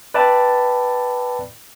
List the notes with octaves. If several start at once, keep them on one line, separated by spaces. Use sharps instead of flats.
B4 D5 E5 G5 A5 B5